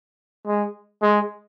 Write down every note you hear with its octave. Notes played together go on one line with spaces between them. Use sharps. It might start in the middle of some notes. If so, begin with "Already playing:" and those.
G#3
G#3